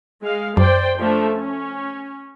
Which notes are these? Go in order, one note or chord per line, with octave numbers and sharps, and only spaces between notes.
G#3 F5
F#2 C5 D5 G5
F3 A3 D4
C#4